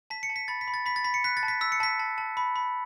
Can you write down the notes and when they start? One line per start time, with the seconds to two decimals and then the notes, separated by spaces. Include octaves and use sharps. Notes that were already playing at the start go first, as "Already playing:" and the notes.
0.10 A5 B6
0.23 C#7
0.30 A5
0.36 B6
0.48 B5 A6
0.61 B6
0.68 B5
0.74 A6
0.86 B5 B6
0.96 A6
1.04 B5 B6
1.14 C#7
1.24 F#6 B6
1.37 A6
1.43 A5
1.48 B6
1.61 E6 B6
1.72 C#7
1.80 A5 B6
1.99 A5
2.18 A5
2.37 B5
2.56 B5